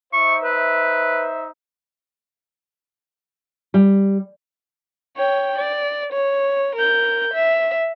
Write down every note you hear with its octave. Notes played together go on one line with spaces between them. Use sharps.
D#4 C5 E5 C#6
B4
G3
C#5 G5
D5
C#5
A#4 G6
E5